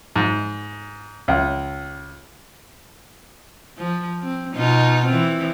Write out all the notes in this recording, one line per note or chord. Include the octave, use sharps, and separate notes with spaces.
G#2
C#2
F3
C4
B2 D#4 F4
E3 C4